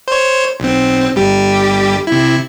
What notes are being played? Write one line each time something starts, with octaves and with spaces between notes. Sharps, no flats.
C5 C#5
B1 C4
G1 G3 G4
C3 E4